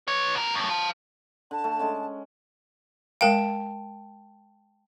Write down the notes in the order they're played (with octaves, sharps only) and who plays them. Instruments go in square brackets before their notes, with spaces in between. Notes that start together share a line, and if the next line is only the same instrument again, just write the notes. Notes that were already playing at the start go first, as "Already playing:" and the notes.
[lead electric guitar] B4 C#5
B2 A#4
F#2 A3
F5 A5
[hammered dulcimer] D3 [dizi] A5
[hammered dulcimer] A3 F#5
G#3 C#4
[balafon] G#3 A#4 F5 [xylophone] G5 A5